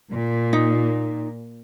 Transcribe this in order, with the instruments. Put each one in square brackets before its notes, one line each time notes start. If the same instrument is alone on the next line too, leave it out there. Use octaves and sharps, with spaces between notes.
[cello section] A#2
[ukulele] D#4